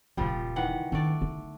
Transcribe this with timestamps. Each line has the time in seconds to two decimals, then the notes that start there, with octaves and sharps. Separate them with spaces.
0.17 D#1 A#2 C#3 F3 G3
0.56 D#3 E3 F#5
0.92 D#3 A3 D4 D5
1.22 D3 D#4